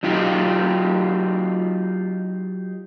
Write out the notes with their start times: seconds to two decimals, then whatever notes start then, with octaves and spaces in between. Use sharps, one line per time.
0.03 F#3 D#4 F4 G4